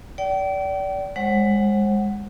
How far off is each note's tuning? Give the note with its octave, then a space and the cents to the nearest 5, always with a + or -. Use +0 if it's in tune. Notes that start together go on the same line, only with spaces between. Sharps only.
D5 -25 G5 -40
G#3 -20 C5 +40 F#5 +10